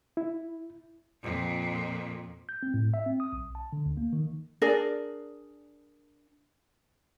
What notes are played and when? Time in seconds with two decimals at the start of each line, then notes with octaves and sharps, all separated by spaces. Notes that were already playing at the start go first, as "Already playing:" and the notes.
0.17 E4
1.23 F2 A#2
2.49 G6
2.63 C4
2.74 A2
2.94 E5
3.06 C4
3.20 D#6
3.33 B1
3.55 A5
3.73 D3
3.86 D2
3.97 A#3
4.13 D#3
4.62 D4 G#4 A#4 D5